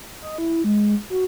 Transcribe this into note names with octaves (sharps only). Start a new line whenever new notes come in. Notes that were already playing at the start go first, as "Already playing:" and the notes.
D#5
E4
G#3
F#4